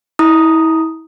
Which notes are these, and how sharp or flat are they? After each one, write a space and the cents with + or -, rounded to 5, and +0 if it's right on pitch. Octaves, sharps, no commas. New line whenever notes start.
E4 -35 A#5 +15 D#6 +0